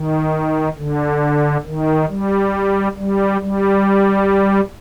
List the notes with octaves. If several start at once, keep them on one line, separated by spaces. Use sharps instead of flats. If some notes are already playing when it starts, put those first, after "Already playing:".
Already playing: D#3
D3
D#3
G3
G3
G3